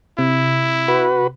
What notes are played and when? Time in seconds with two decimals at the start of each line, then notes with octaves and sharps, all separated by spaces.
0.19 C3 E4
0.88 F#4 B4